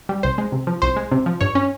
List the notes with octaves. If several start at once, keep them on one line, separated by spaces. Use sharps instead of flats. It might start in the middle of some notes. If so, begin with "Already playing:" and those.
G3
C2 C5
G#3
C3
F3
C2 C5
G#3
C3
F3
G2 C#5
C#4